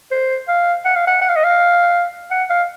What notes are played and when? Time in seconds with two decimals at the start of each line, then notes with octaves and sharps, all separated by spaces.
0.11 C5
0.48 F5
0.85 F#5
0.96 F5
1.07 F#5
1.21 F#5
1.29 F5
1.36 D#5
1.44 F5
2.31 F#5
2.50 F5